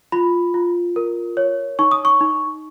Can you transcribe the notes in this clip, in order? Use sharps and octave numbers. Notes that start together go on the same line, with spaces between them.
F4 B5
F4
A#4
C#5
D#4 C#6
D#6
C#6
D#4